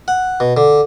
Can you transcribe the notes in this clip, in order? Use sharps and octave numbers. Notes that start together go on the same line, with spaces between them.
F#5
B2
D3